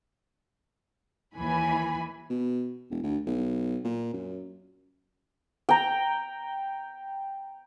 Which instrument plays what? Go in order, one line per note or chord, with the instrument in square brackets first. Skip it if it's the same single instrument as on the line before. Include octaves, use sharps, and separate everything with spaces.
[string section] D#2 E3 G#5 B5
[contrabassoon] B2
E1
D2
B1
A#2
F#2
[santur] G5 A#5